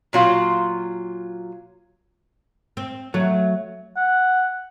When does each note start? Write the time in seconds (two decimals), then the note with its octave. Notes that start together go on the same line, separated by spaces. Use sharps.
0.13 A#2 F#3 F4
2.77 C4
3.14 F#3 A3
3.97 F#5